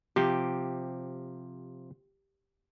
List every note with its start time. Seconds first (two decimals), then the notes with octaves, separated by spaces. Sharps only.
0.16 C3 F3 G4